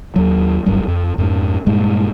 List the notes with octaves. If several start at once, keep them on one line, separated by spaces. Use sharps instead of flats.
D#2 F#3
D1 G1 F#2 G3
F2
F2 G#2
G2 A#2 G#3